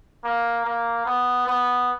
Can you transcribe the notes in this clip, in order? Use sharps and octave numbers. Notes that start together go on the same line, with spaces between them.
A#3
A#3
B3
B3